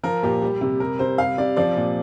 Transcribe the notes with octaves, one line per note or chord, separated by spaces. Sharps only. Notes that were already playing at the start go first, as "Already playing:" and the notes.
F3 A#4
A#2 G4
G3
C3
G3 A#4
C3 C5
G3 F5
C3 D5
F3 D5
A#2